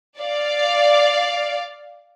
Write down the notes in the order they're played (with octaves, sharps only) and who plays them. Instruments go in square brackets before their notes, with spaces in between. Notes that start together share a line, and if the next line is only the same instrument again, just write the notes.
[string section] D5 F5